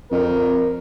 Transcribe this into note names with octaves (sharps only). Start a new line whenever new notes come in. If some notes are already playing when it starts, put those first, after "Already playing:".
F2 A#4